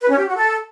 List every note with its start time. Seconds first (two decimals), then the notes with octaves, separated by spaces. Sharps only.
0.01 B4
0.10 C#4
0.19 G4
0.27 F#4
0.36 A4